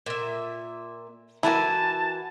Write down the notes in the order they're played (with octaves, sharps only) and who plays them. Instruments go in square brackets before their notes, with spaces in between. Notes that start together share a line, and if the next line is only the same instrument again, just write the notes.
[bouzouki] A#2 E5
[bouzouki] E3 F#4 G#5 [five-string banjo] E4 A#4 [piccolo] A5